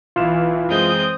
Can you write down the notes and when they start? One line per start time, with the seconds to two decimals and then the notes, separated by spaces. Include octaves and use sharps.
0.16 B1 E3 F4 F6 E7
0.69 F#2 G#3 C4 D#6 G6